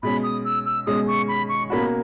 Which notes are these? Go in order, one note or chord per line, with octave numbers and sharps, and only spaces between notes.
B2 G#3 C#4 B5
D#6
E6
E6
B2 G#3 C#4 D#6
C#6
B5
C#6
B2 A#3 C#4 F#4 B5